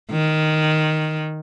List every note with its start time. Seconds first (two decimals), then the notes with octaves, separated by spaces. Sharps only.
0.11 D#3